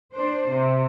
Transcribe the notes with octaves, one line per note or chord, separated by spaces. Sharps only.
D4 C5
C3